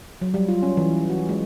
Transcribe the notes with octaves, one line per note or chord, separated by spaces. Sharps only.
F#3
G3
F4
C#4
E3
F#4
G#3